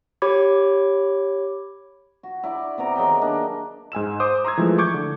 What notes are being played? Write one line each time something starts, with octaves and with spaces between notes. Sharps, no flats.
G4 C#5 B5 D6 G#6
F#4
E4 D5
C3 B3 A#5 D6
D#3 F#3 G#4 G5
A#3 D4 D#4
G#2 G#5 E6 E7
C5 D6 D#6
A#5 C6 D#6 E6 G#6
E3 F3 G#3 A3
C#6 D6 G6 G#6
D3